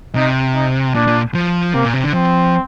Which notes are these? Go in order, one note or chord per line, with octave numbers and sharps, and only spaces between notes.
C3 D#4
D#4
A#2 D4
A#2
F3
C3 A#3
A#2
C3
D3
F3 C4